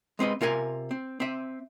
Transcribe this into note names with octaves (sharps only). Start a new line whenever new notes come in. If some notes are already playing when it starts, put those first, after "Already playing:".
G#3 C4 B4 D#5
C3 F4 A#4 G#5
C4
C4 E5